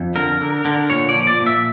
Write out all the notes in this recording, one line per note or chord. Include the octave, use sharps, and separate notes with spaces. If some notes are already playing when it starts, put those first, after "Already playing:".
Already playing: F2
D3 A#4
D3
D3
A#2 C#5
D5
F3
D5
A#2
E5